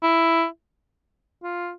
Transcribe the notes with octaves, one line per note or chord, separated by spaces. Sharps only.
E4
F4